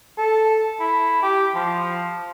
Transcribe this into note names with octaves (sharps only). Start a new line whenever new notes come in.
A4
E4
G4
F3